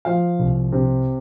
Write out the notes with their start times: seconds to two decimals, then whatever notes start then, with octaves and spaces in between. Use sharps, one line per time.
0.05 F3 F5
0.39 C2
0.72 C3